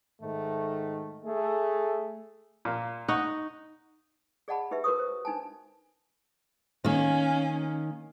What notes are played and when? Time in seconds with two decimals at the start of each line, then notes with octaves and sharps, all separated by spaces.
0.22 G#2 D#3 A3
1.25 A3 G#4
2.65 A#2 A#3
3.08 D#4 F#5 C#6
4.48 G#4 D5 D#5 F#5 A5 B5
4.71 D#4 G4 B4 E5
4.84 F#4 A#4 B4 C#5 C#6 D#6
4.99 C5
5.25 D4 D#4 G#5 A5
6.84 D#3 A#3 C#4